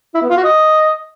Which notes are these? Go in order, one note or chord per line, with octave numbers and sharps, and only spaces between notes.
E4
B3
F4
F#4
D#5